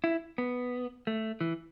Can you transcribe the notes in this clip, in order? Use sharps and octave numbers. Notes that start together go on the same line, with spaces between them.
E4
B3
A3
E3